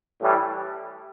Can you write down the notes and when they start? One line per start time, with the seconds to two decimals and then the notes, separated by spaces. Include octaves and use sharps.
0.19 A2 E3 G3